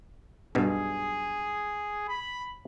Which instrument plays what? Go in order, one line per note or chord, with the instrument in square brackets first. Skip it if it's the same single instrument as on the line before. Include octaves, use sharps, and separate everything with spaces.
[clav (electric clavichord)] B1 G2 B2 [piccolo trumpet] G#4
[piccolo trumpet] B5